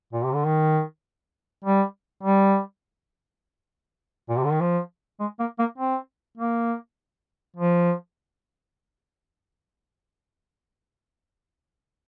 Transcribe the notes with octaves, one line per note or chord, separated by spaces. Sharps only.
A#2
C3
D3
D#3
G3
G3
A#2
C3
D3
D#3
F3
G#3
A#3
A#3
C4
A#3
F3